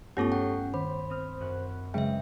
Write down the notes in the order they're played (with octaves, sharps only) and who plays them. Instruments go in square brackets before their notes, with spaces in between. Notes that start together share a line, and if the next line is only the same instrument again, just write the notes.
[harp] G2 [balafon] A3 B3 F4 [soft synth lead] C#4 [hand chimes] G4 A4 C#6
[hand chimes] F#5 G5
[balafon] D#3 [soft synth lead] C5 [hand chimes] B5
[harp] C4 D#6 F6
F#2 F#6
[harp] C#3 B4 [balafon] F#3 [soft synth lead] G#3 [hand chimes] E5 G5